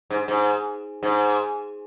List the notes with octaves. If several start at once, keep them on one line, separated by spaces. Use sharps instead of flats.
G#2
G#2
G#2